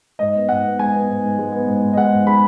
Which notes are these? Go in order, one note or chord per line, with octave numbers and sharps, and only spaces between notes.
G#2 D#5
B3
G#2 F#5
B3
G#3 G#5
B3
G#2
G#2
G#3
B3
G#2
G#2
D#5
G#3 F#5
G#2
G#3 B5